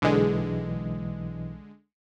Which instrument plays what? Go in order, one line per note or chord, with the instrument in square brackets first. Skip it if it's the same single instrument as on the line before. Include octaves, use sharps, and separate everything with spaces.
[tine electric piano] B1 E3 D#5 [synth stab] D3 G#3